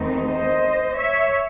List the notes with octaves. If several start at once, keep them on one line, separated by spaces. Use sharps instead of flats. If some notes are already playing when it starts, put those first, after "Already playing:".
Already playing: E2 D#3 A3 C4 D#4
C5 D#5
C#5 E5